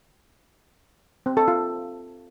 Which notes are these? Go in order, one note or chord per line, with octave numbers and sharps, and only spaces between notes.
C4
A4
F4